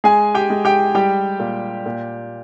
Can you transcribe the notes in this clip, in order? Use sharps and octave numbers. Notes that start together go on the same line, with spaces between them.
G#3 G#4 G#5
G4 G5
G#3
G4 G5
G3 G4 G5
A#2
A#2